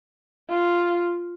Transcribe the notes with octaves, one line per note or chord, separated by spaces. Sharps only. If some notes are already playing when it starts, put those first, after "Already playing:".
F4